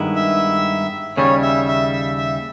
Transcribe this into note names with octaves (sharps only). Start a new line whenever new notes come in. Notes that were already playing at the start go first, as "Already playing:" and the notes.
Already playing: G2 D#3 G#3 B3 E4
E5
D#2 C#3 G3 C#5
E5
E5
E5
E5